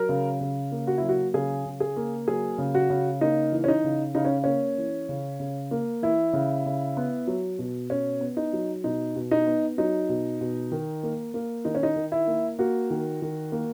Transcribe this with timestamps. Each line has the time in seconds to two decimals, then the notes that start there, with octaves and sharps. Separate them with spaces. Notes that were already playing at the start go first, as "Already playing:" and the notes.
Already playing: F#3 A#4
0.09 C#3
0.41 C#3
0.72 A#3
0.87 F#4
0.98 F#3 E4
1.09 F#4
1.34 C#3 G#4
1.66 C#3
1.80 G#4
1.97 A#3
2.28 F#3 G#4
2.58 C#3
2.75 F#4
2.90 C#3
3.21 A#3 D#4
3.52 E3
3.64 C#4
3.68 D#4
3.84 C#3
4.15 C#3 D#4
4.25 C#4
4.44 A#3 C#4
4.78 E3
5.09 C#3
5.40 C#3
5.71 A#3
6.02 E3 E4
6.33 C#3
6.66 C#3
6.97 B3
7.27 F#3
7.59 B2
7.90 B2 C#4
8.21 B3
8.37 D#4
8.53 F#3
8.84 B2 D#4
9.16 B2
9.31 D#4
9.47 B3
9.78 F#3 D#4
10.09 B2
10.41 B2
10.72 D#3
11.03 A#3
11.34 A#3
11.65 D#3 D#4
11.75 C#4
11.83 D#4
11.96 D#3
12.12 E4
12.27 A#3
12.59 A#3 F#4
12.90 D#3
13.22 D#3
13.52 A#3